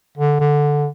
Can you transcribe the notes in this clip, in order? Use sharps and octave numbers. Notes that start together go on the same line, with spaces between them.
D3
D3